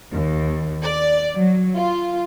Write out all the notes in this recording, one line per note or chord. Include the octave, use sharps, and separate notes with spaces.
D#2
D5
F#3
F4